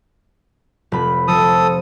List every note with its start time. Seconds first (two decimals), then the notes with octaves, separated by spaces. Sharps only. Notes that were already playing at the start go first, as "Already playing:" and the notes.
0.92 F1 B5
1.28 F3 A4 D#6